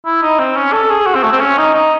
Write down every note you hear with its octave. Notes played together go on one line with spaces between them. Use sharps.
E4
D#4
C4
C#4
A4
G#4
F#4
C4
A3
C4
C#4
D#4
D#4